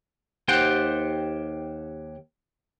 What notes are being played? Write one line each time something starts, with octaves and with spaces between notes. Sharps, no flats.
D#2 G4 C5 F#5 G5